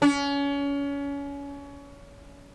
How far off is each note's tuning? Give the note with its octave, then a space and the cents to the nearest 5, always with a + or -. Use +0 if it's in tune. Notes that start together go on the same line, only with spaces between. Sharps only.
C#4 +30